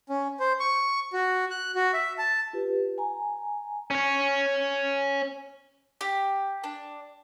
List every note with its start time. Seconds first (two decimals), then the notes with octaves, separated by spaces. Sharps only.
0.09 C#4
0.40 C5
0.60 C#6
1.13 F#4
1.51 F#6
1.75 F#4
1.94 E5
2.18 A5
2.53 F4 G4 B4
2.98 G#5 A#5
3.91 C#4 C#5
6.01 G4
6.64 D4